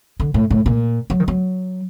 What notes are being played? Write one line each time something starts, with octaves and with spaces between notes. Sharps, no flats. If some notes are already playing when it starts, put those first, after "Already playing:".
D3
A2
A2
A#2
F#3
D#3
F#3